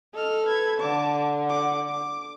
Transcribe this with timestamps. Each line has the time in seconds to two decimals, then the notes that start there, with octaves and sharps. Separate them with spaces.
0.14 A4 D#5 F6
0.46 B4 G#6
0.80 D3 A5 D6
1.48 F#5 D6
1.89 D6